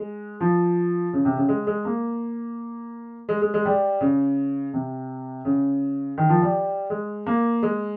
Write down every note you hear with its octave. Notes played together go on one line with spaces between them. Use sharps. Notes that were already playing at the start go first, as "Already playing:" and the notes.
Already playing: G#3
F3
C#3
C3
C#3
G#3
G#3
A#3
G#3
G#3
G#3
G3
C#3
C3
C#3
D#3
F3
G3
G#3
A#3
G#3